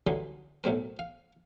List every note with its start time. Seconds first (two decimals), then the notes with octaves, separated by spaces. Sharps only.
0.07 C2 D3 E3 F#3 D#4 C6
0.64 B1 A2 F#3 C4 A#4
0.99 F5